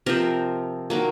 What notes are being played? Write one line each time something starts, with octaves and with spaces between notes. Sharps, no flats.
C3 F3 C4 A#4
D#3 F#3 A#3